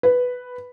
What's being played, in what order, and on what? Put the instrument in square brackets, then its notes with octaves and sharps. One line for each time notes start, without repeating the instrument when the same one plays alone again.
[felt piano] B4